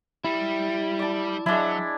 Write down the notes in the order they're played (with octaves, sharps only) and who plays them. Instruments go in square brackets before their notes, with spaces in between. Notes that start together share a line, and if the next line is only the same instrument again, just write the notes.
[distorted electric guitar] G3 [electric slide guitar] E4
[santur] D5 A5
[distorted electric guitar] F#3 [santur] G#3 D4 E4